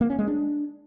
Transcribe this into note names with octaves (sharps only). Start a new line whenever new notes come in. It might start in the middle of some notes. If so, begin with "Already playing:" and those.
A#3
C#4
G#3
D4